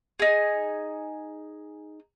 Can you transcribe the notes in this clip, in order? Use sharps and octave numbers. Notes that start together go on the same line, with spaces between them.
D#4 G#4